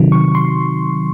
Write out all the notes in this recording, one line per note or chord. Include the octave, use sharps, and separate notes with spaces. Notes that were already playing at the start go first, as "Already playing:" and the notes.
Already playing: C3 D#3 F#3
C#6
C6